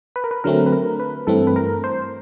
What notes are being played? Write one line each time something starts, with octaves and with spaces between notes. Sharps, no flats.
B4
A#4
B4
D3 F#3 A3 C4 A#4
B4
A#4
B4
G2 E3 A3 C4 A4
B4
A#4
C5